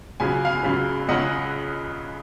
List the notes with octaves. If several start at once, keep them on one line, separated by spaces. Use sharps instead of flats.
C#2 C#3 F#3 G#5
F5 G#5
C#2 C#3 F#3
C#2 C#3 G#3 C#4 D#5 F#5